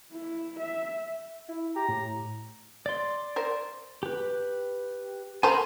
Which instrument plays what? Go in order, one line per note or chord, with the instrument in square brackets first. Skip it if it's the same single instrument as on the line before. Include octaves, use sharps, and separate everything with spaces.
[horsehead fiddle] E4
E5
[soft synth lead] E4
[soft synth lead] G4 [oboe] A#5
[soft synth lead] A2
[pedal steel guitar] D5 C6
[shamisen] A#4 C5
[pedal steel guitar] G4 B4
[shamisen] A4 A#4 C5 [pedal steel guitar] G#5 A#5 B5